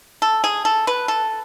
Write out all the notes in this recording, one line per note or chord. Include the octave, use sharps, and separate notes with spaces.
A4
G#4
A4
B4
A4